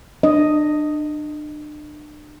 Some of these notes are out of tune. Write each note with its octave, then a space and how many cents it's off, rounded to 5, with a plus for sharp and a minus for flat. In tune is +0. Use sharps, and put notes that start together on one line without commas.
D4 +35 D#5 +0